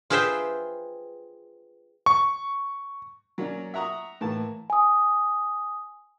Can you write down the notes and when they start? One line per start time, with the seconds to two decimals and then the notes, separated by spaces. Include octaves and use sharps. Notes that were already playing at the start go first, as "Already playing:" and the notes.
0.10 F4 G#4 B4 C5 E5 G5
2.06 C#6
3.38 F#3 A#3 C#4 D5
3.74 E5 F#5 A#5 C#6 D#6
4.21 A2 E3 A#3 A5
4.70 G#5 D#6